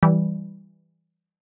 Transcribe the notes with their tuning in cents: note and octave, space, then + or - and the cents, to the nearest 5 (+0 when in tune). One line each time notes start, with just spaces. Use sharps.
E3 +0 G3 +0